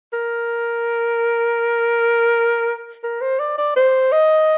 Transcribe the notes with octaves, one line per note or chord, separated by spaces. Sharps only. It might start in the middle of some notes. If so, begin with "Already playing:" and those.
A#4
A#4
C5
D5
D5
C5
D#5